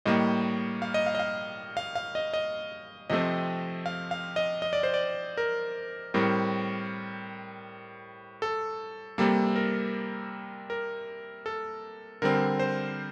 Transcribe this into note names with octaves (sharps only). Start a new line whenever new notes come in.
A2 G3 A#3 D#5
F5
D#5
F5
D#5
F5
F5
F5
D#5
D#5
C3 F3 A3 C4 D#5
F5
F5
D#5
D#5
D5
C5
D5
A#4
A2 G3 C4 A#4
A4
C3 G3 A#3 A4
A#4
A#4
A4
D3 G3 C4 A#4
C5